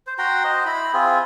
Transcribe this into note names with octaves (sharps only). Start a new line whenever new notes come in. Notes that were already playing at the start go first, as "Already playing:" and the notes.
C5
F#4 G5 A#5 C6
C5 D#5
E4 B5
C4 F4 G#4